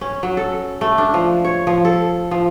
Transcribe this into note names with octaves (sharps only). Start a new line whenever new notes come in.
C#4
F#3
A4
A3
D4
F3
C#5
F3
A4
F3